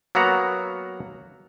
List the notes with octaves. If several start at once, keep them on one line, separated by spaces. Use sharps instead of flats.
F#3 A#3 B3 F#4 F#5 A#5